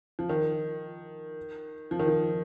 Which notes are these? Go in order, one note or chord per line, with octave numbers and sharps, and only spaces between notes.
F3
D#3
F3
D#3
F3